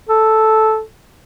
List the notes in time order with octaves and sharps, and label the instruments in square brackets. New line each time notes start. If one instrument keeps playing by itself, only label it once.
[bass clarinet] A4